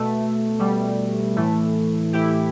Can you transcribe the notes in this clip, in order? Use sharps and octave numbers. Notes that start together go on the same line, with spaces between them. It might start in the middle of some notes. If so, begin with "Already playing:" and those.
Already playing: B2 A3
B2 G3
A2 E3 A3
A2 E3 E4 G4